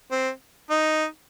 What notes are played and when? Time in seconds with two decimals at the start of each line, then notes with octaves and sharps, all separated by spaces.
0.11 C4
0.70 D#4